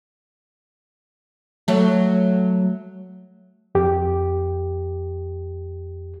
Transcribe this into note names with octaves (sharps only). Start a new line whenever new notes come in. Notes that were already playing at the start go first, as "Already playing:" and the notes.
F#3 A3
F2 G4